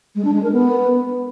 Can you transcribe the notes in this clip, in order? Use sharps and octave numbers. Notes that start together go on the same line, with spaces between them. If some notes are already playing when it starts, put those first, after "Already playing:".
G#3
D4
G#3
A#4
B3